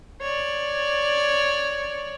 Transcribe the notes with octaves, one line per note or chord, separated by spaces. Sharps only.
C#5 D5